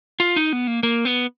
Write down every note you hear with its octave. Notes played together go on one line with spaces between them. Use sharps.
F4
D#4
B3
A#3
A#3
B3